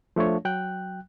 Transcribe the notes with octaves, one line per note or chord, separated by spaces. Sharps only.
F3 A3 D4 C#5
F#3 G5 F#6